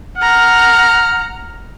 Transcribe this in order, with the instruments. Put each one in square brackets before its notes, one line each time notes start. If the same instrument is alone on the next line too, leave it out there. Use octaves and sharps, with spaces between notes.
[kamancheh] F#5 A#5 [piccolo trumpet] F6